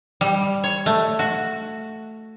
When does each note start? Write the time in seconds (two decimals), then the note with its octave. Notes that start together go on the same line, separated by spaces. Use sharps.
0.21 G3
0.64 C#5
0.86 A3
1.19 F#4